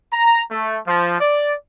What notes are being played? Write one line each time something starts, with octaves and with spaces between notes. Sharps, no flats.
A#5
A3
F3
D5